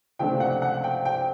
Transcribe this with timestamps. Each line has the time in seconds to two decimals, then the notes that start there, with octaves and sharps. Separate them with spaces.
0.19 C#2 C3 F3 A3 D4 G5
0.40 F#5
0.62 F#5
0.84 G5
1.05 G5